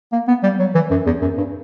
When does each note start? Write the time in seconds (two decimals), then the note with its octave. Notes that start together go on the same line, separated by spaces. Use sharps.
0.13 A#3
0.28 B3
0.43 G3
0.59 F#3
0.75 E3
0.91 F#2
1.06 E2
1.22 F#2
1.38 G2